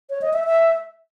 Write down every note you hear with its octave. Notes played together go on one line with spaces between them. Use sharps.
C#5
D#5
E5
E5